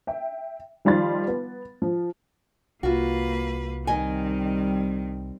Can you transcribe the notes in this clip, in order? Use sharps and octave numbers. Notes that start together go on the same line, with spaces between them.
E5 G5
D#3 F3 G3 F5 C6 A6
B3
F3
C2 A#3 F4 F#4 B4
D#3 G3 C4 D#5 G#5